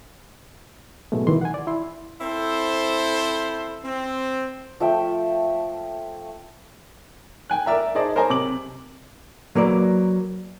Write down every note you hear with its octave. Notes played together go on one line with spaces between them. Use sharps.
G#2 B2 F#3 G#3 A3
C2 D#3 E3 C6
F#5 G#5
D5
E4 C6
C4 E4 A4 C5
C4
F3 A3 E5 G5
G5 G#5 F#6
A#4 D5 E5 A#5
D#4 G#4 C5 D5 D#5 A5
A#4 C5 C#5 D#5 G#5 A#5
C3 D6 F#7
F#3 A#3 B4 D5